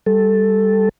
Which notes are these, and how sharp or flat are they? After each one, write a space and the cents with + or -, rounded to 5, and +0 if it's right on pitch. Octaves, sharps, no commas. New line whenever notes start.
G3 +0 A4 +0